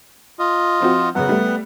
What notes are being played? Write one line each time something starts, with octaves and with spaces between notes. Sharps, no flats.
F4 D#5
F3 C4 F#4
F#2 C#3 B3 F#5
G3 A3